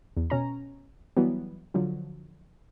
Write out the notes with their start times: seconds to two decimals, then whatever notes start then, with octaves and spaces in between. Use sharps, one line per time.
0.17 E2
0.30 B2 C#4 A#5
1.17 E3 F#3 G3 B3
1.74 D3 F3 F#3